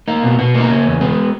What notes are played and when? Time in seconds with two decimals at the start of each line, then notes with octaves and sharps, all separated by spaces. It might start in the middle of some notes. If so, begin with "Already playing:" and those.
0.08 A#3 D#4
0.23 B2
0.39 B2 B3
0.55 A#3
0.60 D#4
0.70 C#3 C#4
0.85 E2
1.01 G#3 B3